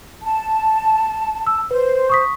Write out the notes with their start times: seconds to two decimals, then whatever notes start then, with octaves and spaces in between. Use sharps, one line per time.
0.23 A5
1.47 E6
1.71 B4 C5
2.10 C#6 D#6 B6